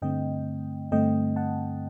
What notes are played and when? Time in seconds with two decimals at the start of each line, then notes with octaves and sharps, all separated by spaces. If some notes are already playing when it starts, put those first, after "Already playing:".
0.02 G2 D3 A3 C4 D#5 G5
0.92 G2 D3 A3 C4 D#5 G5
1.36 F#5 A5